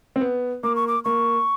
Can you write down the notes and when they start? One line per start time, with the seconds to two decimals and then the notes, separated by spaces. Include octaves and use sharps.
0.16 C4
0.21 B3
0.63 A#3 D6
0.76 C#6
0.88 D6
1.05 A#3 C#6